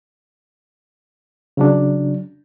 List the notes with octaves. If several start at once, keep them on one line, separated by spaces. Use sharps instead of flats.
C#3 F#3 D4